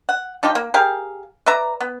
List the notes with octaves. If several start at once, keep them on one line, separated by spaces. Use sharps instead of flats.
F#5
F3 D#4 F4 G4
A#3
G4 G#4 A#4 F5
B4 D5 E5 A#5
B3